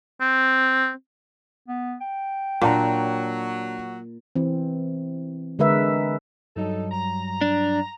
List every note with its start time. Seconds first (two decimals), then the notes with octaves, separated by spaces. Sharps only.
0.21 C4
1.68 B3
2.01 G5
2.61 A#2 F#3 D4 A5 A#5
4.36 E3 C4
5.59 D3 G#3 A#4 B4 E5
6.56 G2 F#3 G3 D#4 A4
6.92 A#5
7.41 D4